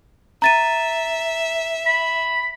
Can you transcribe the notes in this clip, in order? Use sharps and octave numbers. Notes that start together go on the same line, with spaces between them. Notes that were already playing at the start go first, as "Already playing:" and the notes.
E5 A#5 A6 D#7
B5